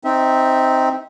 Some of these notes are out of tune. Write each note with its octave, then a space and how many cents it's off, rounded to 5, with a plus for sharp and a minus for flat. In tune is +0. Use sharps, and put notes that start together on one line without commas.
C4 +0 D#4 +0 E5 -20